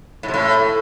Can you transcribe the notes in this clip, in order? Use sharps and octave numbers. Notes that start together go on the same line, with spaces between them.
A2
C3
A2